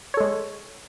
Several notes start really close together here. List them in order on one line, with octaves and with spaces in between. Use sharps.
C#5 A4 G#3